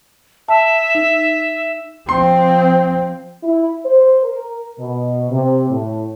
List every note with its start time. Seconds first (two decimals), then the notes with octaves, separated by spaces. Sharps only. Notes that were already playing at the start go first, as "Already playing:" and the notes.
0.48 E5 A5
0.95 D#4
2.09 F3 C4 C6
3.43 E4
3.85 C5
4.24 A#4
4.80 B2
5.30 C3
5.70 A2